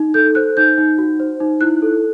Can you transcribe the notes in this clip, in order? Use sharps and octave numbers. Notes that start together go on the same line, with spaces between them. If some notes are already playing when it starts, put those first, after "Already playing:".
Already playing: D#4
A4 G6
C5 F#6
D#4 G6
D#4
F#4
C5
D#4
E4 F#6
A4